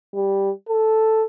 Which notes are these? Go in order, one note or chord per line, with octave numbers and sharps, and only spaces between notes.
G3
A4